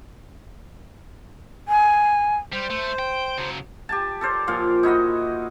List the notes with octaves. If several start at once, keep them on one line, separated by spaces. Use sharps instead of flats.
G#5
G3 C5
A3
G5
C#3 F#3
G4 G#5 A5
A4 A#4 C5 D5
A#2 F3 F5
D#4 E4 F#4 D#5